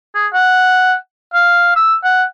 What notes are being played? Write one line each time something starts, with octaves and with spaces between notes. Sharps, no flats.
G#4
F#5
F5
E6
F#5